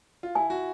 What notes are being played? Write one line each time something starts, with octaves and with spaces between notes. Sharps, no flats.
F4
E4 G#5
F#4